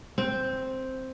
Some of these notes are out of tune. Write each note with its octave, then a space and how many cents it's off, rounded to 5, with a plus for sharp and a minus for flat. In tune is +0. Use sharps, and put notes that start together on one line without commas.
C4 +0